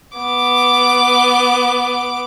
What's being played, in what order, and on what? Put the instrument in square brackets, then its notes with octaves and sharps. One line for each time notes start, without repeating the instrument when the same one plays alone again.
[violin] B3 D6